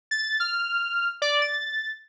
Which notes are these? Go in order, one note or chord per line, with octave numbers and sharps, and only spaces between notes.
A6
F6
D5
A6